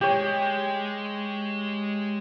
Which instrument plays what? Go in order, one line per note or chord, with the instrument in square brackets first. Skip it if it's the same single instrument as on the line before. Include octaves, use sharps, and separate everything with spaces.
[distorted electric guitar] G#3 [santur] G4 C#5